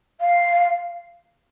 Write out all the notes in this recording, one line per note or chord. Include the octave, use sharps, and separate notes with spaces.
F5